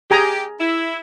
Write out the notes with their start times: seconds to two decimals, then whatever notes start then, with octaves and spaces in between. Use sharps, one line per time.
0.11 G4 G#4 G#5 A#5
0.60 E4